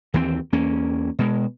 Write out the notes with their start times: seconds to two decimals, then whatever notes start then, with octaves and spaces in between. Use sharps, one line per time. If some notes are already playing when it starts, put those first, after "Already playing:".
0.14 D#2 E3 F#3 C4
0.52 E2 A#3 C#4
1.19 B2 G#3